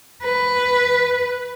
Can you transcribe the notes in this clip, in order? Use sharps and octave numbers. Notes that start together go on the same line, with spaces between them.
B4